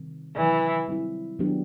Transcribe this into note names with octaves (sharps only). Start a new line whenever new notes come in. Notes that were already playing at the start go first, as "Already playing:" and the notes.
Already playing: C3 D#3 G3 C4
C3 D#3 E3 F#3
G3 C4 E4
D#3 F#3 B3 D4 G4